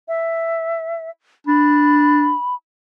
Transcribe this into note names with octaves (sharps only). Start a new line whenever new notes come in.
E5
D4 B5